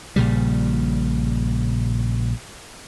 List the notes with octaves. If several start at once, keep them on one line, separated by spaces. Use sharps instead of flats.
A#1 A#2 C#3 G3